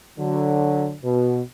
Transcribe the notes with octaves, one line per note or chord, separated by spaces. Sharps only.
D3 F#3
B2